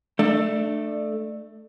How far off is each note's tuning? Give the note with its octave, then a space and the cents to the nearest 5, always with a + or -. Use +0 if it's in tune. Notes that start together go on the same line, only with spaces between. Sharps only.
A3 +0 D4 +25